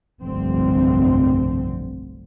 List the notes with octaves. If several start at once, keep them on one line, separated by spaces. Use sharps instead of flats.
F1 B1 G2 D3 C4